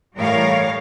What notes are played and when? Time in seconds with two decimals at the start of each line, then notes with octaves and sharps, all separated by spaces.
0.17 A2 E3 G3 A#4 C#5 F5